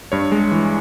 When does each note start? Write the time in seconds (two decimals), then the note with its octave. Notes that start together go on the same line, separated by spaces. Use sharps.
0.12 G2 C#5
0.32 G#3
0.51 E3